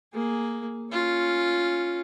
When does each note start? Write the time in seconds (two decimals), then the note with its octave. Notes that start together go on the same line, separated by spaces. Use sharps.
0.13 A#3 G#4
0.91 C#4 F4